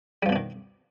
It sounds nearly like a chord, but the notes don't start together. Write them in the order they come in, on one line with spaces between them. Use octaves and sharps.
G3 F3 B2 D4 D#3